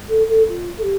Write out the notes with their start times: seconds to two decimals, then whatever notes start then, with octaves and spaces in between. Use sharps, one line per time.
0.09 A4
0.28 A4
0.48 F4
0.78 A4
0.82 G4